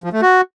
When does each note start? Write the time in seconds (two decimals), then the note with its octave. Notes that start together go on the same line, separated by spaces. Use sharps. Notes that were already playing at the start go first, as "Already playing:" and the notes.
0.04 F3
0.13 A3
0.22 F#4